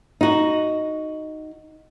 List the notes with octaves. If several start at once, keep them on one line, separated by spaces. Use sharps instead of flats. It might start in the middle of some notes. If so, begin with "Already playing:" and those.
D#4 F#4